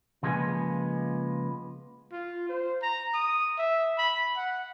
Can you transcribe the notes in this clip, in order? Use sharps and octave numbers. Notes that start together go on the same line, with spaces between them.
C#3 F3 G#3 A#3 B3 G#5
F4
C5
A#5
D#6
E5
B5
F#5